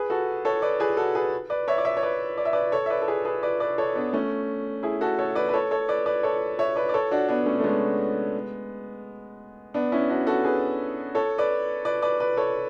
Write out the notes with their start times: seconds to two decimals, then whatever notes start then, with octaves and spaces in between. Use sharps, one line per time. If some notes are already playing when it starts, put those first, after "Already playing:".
Already playing: G#4 B4
0.10 F#4 A4
0.45 A4 C#5
0.62 B4 D5
0.80 G#4 B4
0.97 F#4 A4
1.15 G#4 B4
1.50 B4 D5
1.68 C#5 E5
1.78 D5
1.85 C#5 E5
1.97 C#5
2.03 B4 D5
2.38 D5
2.45 E5
2.53 B4 D5
2.72 A4 C#5
2.86 E5
2.90 B4 D5
3.02 A4
3.08 G#4 B4
3.25 G#4 B4
3.43 B4 D5
3.60 B4 D5
3.78 A4 C#5
3.95 B3 D4
4.13 A3 C#4
4.83 E4 G#4
5.01 F#4 A4
5.19 A4 C#5
5.35 B4 D5
5.49 B4
5.53 A4 C#5
5.71 A4 C#5
5.88 B4 D5
6.06 B4 D5
6.23 A4 C#5
6.59 C#5 E5
6.76 B4 D5
6.89 D5
6.94 A4 C#5
7.11 D4 F#4
7.28 B3 D4
7.46 A3 C#4
7.59 A3
7.64 G#3 B3
9.74 B3 D4
9.92 C#4 E4
10.10 D4 F#4
10.27 F#4 A4
10.44 G#4 B4
11.15 A4 C#5
11.38 B4 D5
11.85 B4 D5
12.02 B4 D5
12.20 B4 D5
12.37 A4 C#5